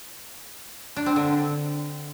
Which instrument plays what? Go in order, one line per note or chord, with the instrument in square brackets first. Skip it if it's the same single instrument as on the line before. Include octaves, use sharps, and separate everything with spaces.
[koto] D4
C4
D3